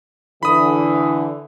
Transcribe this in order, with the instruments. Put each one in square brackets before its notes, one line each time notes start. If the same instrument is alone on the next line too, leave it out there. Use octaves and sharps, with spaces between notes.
[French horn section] D3 E3 [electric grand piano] B5 D#6